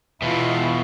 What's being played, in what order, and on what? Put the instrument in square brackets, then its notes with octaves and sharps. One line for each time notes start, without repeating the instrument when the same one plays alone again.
[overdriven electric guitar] E2 B2 [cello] E4 F4